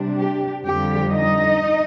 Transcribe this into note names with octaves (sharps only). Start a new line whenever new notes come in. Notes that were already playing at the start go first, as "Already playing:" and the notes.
Already playing: C3 G3 D4
G4
F2 D3 G3 G4
D#4 D#5